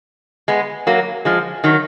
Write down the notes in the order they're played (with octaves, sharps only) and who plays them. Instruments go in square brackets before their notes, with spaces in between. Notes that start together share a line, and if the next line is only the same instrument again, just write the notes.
[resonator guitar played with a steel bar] G#3 B3
F#3 A#3
F3 G#3
D#3 F#3